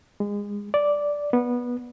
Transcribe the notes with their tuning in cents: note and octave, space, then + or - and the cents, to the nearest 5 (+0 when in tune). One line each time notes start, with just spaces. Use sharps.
G#3 -25
D5 -5
B3 -15